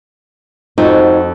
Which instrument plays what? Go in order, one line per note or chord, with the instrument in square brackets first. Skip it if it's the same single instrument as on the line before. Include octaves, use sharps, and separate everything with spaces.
[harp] F2 [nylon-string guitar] D#4 F#4